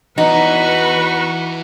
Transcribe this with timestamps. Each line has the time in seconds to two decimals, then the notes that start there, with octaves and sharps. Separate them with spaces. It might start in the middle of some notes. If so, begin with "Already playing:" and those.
0.18 E2 B3 D#4 F#4 B4 C#6